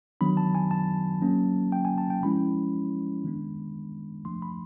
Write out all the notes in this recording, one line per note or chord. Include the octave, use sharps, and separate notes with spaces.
D#3 F#3 B3 D4 B5
A5
G#5
A5
F#3 A#3 C#4
G5
G#5
A5
G5
F3 G#3 C#4 E4 B5
D#3 G#3 B3 D4
F3 A3 D4 C6
B5